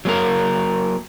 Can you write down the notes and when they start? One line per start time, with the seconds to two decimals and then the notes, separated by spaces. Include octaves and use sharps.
0.05 F#3 A#3 A#4